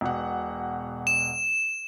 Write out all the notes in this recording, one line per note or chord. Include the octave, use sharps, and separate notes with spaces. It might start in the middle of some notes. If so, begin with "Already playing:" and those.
E1 B2 F#5
E7